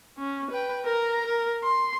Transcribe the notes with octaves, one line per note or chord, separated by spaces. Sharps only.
C#4
B4 G5
A#4 A#5
A#4
C6